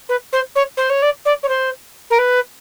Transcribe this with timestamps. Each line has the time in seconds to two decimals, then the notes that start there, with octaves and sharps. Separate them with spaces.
0.09 B4
0.33 C5
0.56 C#5
0.77 C5
0.90 C#5
1.02 D5
1.25 D5
1.43 C#5
1.49 C5
2.10 A#4
2.19 B4